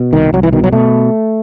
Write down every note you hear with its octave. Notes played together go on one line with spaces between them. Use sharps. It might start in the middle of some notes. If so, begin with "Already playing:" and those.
Already playing: B2
C2 D#3
C2 F#3
E3
B2 D#3
F#3
B2 A3